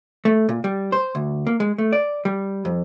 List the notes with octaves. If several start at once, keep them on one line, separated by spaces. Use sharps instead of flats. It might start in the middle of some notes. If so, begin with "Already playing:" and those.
A3
A#2
G3
C5
D2
A#3
G#3
A3
D5
G3
F2